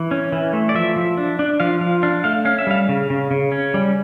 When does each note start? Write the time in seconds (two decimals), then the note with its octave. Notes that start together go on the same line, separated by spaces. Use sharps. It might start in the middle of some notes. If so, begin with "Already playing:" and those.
Already playing: E3
0.11 C#4
0.32 E3
0.53 A3
0.69 D5
0.75 F3 E5
0.96 F3
1.18 D4
1.39 D4
1.60 F3 F5
1.81 F3 F5
2.03 D4 F5
2.24 A3 F5
2.45 C#4 F5
2.59 E5
2.67 G3 F5
2.89 C#3
3.10 C#3
3.31 C#3
3.52 C#4
3.74 G3